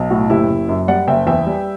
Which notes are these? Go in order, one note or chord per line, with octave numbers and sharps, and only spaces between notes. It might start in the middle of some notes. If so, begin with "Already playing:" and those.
Already playing: B1
A2 F#4
F#1 E4 G4
F#1
F#2
G3 D5 F#5
F#1 E5 G5
E2 E5 G5
G3